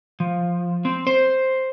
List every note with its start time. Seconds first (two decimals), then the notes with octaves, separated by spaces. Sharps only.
0.20 F3
0.85 C4
1.07 C5